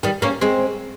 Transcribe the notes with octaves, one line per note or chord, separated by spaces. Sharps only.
D#3 G3
A#3 C#4
G#3 C4